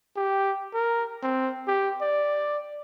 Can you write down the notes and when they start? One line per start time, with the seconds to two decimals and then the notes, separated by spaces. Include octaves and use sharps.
0.16 G4
0.74 A#4
1.23 C4
1.67 G4
2.01 D5